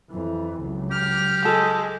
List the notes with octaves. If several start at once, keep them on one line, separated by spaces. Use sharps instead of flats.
F2 E3
C#2 F#3
G4 F6
G#3 A4